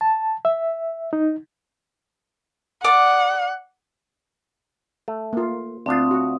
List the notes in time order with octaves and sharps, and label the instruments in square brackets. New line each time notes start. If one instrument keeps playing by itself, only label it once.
[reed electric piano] A5
E5
D#4
[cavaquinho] D5 D6 D#6 [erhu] F#5
[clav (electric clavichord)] A3
[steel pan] A#3 F4
[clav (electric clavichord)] D2 D4 F4 [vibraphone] C4 D#6
[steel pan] F#4